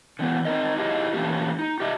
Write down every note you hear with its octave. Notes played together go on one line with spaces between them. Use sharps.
D3 E3 B3
C4 D#4 A#4 D#5
D#4 E4 G4 G#4 A#4 D#5
E3 A3 A#3 C#4 D4 G4
D#4
G4 D#5 E5